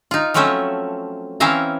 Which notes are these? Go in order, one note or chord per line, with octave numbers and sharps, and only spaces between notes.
D#4 F4
F3 F#3 A3 C4 C#4 E5
E3 C4 C#4 E5 F5 A#5